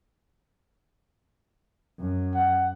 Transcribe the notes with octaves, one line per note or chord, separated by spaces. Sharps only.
F#2
F#5